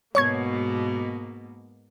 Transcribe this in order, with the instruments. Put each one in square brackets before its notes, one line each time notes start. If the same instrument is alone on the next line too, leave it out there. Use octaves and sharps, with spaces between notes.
[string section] G#2 B2 A#3 [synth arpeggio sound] C#5 C#6 G#6